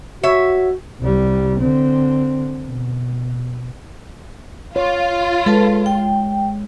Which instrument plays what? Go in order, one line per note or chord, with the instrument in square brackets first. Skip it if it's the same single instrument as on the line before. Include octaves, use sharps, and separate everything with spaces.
[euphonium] F#4 [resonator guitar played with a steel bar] C#5 E5
[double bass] C2 G3
D3 C4
B2
[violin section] F4 [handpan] C#5
[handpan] G#3 [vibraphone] A4 B4 A5
[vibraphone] G5